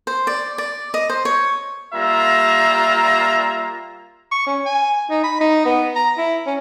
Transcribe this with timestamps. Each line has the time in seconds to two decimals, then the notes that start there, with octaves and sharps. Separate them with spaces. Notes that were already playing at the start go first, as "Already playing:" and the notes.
0.07 C5
0.27 D5
0.58 D5
0.94 D#5
1.10 C5
1.25 C#5
1.93 G3 A#3 F4 E5 A#5
4.31 C#6
4.46 C#4
4.66 G#5
5.10 D#4
5.24 B5
5.40 D#4
5.65 B3
5.96 A#5
6.17 E4
6.46 C#4